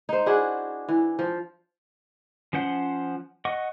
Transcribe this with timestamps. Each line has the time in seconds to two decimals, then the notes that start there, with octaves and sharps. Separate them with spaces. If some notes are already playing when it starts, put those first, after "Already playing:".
0.09 D#4 C5
0.26 D4 E4 F#4 G#4
0.88 E3
1.19 F3
2.53 F3 C#4 C5 F#5 C6
3.45 D#5 F#5 C#6